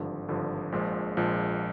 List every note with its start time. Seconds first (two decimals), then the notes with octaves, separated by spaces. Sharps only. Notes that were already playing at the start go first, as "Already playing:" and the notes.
Already playing: G#1 G2 D3 F3
0.29 G#1 G2 D3 F3
0.72 A#1 A#2 F3 G#3
1.17 A#1 A#2 F3 G#3